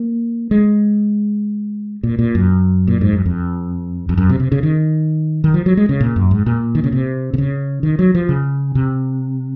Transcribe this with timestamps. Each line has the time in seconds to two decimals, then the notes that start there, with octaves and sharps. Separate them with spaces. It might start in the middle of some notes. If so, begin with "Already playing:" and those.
Already playing: A#3
0.51 G#3
2.03 A#2
2.19 A#2
2.35 F#2
2.87 A#2
3.01 G#2
3.13 F#2
3.26 F2
4.09 F2
4.18 F#2
4.29 C3
4.40 C3
4.52 C#3
4.63 D#3
5.44 D#3
5.54 F3
5.66 F#3
5.77 G#3
5.89 C#3
6.00 A#2
6.16 F#2
6.31 G#2
6.46 A#2
6.75 D#3
6.84 C#3
6.92 C3
7.34 C3
7.38 C#3
7.83 D#3
7.99 F#3
8.15 F3
8.29 C#3
8.75 C3